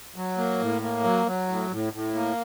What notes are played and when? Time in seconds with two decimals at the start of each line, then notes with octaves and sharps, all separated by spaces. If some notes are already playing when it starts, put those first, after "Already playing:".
0.16 F#3
0.37 A#3
0.60 A2
0.82 A#3
1.04 F#3
1.26 F#3
1.49 A2
1.71 A2
1.93 A2
2.15 A#3